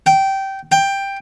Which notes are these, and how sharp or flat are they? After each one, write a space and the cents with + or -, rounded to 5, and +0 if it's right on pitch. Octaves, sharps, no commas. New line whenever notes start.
G5 -15
G5 +10